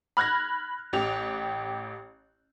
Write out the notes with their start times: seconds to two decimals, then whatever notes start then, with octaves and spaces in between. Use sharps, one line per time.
0.17 B5 F6 F#6 G#6 A#6
0.93 A1 G4 F7